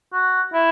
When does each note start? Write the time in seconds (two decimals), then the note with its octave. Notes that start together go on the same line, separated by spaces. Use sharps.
0.13 F#4
0.53 E4